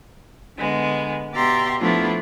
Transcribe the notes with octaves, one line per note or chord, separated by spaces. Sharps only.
D3 G#3 B3
B2 G4 D5 E5 A#5 C6
F3 A3 B3 D4 E4 F4